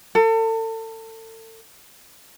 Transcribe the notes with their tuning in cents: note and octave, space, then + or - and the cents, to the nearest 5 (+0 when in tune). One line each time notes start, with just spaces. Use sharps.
A4 +35